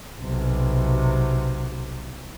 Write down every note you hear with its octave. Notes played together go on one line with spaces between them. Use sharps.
B1 C3